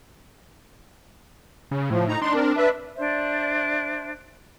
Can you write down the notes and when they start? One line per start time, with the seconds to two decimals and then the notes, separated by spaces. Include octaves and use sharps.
1.71 C#3
1.90 A2 F3
2.08 D#4 A#5
2.21 D4 D#4 C6
2.35 C4 A#4
2.57 B4 E5
2.96 D4 C5 D5 E5